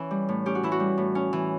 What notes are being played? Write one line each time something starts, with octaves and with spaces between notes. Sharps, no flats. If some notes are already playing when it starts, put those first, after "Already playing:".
Already playing: E3 C#4
G3
A2
C#4 G4
F#4
E3 E4
F#4
G3
A2
C#4
E3